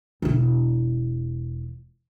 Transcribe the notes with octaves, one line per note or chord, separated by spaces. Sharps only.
E1 E4